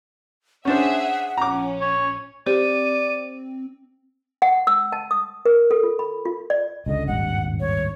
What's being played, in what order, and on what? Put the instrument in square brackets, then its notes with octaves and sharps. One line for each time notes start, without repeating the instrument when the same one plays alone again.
[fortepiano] C#4 D4 C5 [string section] G#4 E5 [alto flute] F#5
[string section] A#1 C#4 [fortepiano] A#5 D6
[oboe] C#5
[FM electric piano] C4 [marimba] G4 [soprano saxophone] D5 [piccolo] D#7
[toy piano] F#5
E6
A5
D#6
A#4
A4
F4
B5
F4
D5
[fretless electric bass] C#2 D3 [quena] D#5
[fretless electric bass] D#1 G#1 G2 [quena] F#5
[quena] C#5